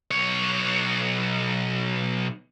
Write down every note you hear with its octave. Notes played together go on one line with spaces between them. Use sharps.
B1 C#5